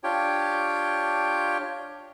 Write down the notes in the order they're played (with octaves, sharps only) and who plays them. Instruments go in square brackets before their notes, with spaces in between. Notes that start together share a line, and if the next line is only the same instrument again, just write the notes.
[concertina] D4 F4 G4 C#5 G5